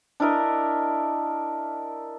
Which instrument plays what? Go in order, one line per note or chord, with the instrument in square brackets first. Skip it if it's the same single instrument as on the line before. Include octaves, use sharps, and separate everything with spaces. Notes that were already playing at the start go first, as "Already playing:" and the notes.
[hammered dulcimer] D4 E4 A#4 D#5